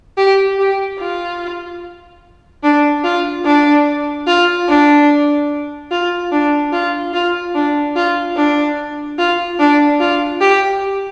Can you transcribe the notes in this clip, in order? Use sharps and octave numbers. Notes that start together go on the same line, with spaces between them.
G4
G4
F4
D4
F4
D4
F4
D4
F4
D4
F4
F4
D4
F4
D4
F4
D4
F4
G4